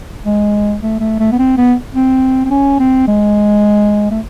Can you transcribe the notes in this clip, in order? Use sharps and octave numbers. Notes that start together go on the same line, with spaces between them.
G#3
A3
A3
A3
B3
C4
B3
C4
C4
C#4
C4
G#3
A3